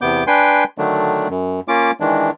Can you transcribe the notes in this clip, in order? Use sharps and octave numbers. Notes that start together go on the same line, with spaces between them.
E2 C3 B3 D6 G6
D4 B4 G5 G#5 C6
D3 D#3 F#3 A3 D4
F#2
A#3 C#4 F4 D6
D#3 E3 G#3 D4